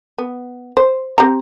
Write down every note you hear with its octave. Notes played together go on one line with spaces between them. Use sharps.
B3
C5
C4 G4 A#5